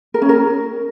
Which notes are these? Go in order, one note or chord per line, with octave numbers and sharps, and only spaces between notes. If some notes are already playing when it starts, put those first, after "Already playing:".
A#4
C#4
A#4